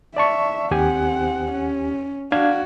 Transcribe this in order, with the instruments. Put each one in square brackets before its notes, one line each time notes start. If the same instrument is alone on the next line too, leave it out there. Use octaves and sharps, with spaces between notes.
[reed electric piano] D5 A5 C#6 [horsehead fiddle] E5
[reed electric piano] D#2 G4 G#5 [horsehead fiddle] C4 F#5
[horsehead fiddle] C#4
[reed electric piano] D4 F5 G#6 [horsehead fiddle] F#4